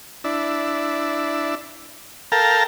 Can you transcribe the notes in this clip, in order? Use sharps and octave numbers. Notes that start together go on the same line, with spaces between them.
D4 E4
A4 A#4 F5 G5 A5 A#5